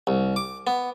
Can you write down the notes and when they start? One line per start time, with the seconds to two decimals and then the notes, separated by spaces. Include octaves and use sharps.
0.07 C2
0.36 D6
0.67 B3